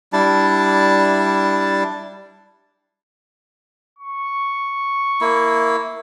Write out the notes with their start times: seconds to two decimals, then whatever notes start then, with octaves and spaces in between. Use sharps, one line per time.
0.13 G3 D4 E4 A5
3.99 C#6
5.21 A#3 E4